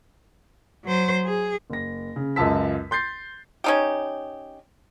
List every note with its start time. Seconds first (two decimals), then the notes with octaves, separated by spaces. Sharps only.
0.85 F#3 C5
1.25 G#4
1.70 F#1 A#6
2.16 C#3
2.36 C#2 F#2 F4 A5 E6 B6
2.91 C6 G6 A6 C7
3.64 C#4 D#4 G4